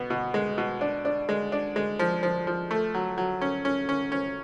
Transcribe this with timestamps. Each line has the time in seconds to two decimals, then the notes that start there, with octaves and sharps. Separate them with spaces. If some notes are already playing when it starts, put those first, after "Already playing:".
Already playing: B2 B3
0.10 B2
0.34 G#3
0.58 B2
0.81 D4
1.05 D4
1.29 G#3
1.52 D4
1.76 G#3
1.99 F3
2.23 F3
2.47 F3
2.71 A3
2.94 F#3
3.18 F#3
3.41 C#4
3.65 C#4
3.89 C#4
4.12 C#4